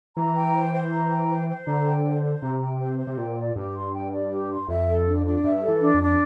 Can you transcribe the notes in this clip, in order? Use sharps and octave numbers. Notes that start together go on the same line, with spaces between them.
E3 A#5
G5
C5
C5
A#5
G5
C5
C5
D3 A#5
G5
C5
C5
C3 A#5
G5
C5
C5
C3
A#2 G5
D5
G2 G4
C6
G5
D5
G4
C6
F2 E5
A4
D4
D4
G2 E5
A4
E3
D4
F2
D4